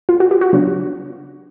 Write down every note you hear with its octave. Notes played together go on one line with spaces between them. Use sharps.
F4
F#4
G4
F#4
C#3 F#3 B3 D4 F4